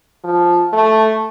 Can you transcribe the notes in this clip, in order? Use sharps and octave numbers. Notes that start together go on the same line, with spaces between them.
F3
A3